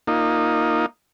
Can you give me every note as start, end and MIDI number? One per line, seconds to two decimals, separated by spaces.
0.07 0.86 58
0.07 0.86 63
0.07 0.86 65